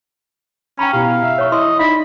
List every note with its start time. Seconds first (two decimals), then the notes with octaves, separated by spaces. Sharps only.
0.79 C#4 G5 A#5 B5
0.93 B2 E4 G4 F5
1.23 E5
1.38 C#5 C#6
1.52 E4 D#5 C6
1.79 D#4 D5 E5 B5